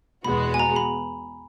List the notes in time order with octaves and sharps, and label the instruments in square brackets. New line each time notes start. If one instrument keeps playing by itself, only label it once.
[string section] E2 B2 G#3 B3 F#4 [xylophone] B5
[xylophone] G#5
A#5
B5